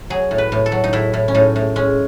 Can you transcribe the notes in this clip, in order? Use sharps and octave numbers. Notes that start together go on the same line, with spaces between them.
F#3 G#4
A2
B4
A2
A4
F#3
D#4
A2 E4
A2
C#4
A2 D#4
A2
G#3 C#4